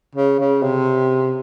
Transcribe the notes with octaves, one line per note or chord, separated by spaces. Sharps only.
C#3
C#3
C3